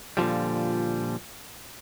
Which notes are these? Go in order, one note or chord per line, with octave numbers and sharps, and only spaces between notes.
A#2 D3 F3 G3